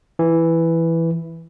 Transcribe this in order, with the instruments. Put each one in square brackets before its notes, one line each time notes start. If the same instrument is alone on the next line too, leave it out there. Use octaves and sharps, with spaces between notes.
[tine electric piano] E3